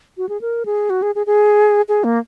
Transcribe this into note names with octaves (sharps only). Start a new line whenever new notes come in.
F#4
G#4
A#4
G#4
F#4
G#4
G#4
G#4
G#4
A#3